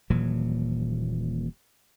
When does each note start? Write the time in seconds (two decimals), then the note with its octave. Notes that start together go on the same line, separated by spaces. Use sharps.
0.10 D#1 A#2 E3 F#3